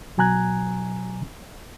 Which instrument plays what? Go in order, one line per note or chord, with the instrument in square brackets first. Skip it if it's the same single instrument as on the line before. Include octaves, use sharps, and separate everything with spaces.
[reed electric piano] B2 F#3 G#5 A#5 F#6 G#6